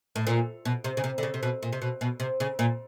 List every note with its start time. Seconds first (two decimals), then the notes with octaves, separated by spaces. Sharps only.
0.16 A2
0.27 A#2
0.65 B2
0.84 C3
0.97 C#3
1.04 C3
1.18 D3
1.23 C#3
1.34 C3
1.43 B2
1.63 A#2
1.73 C3
1.82 B2
2.01 B2
2.20 C3
2.40 C#3
2.59 A#2